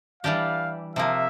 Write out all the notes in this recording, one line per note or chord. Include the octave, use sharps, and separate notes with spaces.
E3 G3 D4 G4 F5
C3 F3 A#3 E5